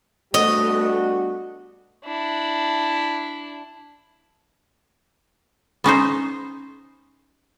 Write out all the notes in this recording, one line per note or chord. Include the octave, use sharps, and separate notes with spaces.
G3 A3 B3 D4 F#4 D#5
D4 E4
B3 C#4 D#4 C5